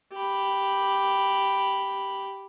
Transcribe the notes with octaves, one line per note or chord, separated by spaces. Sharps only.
G4 B5